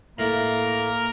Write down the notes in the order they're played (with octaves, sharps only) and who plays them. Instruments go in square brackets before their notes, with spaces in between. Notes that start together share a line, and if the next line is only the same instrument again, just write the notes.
[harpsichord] A2 [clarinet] A#3 [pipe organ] A#4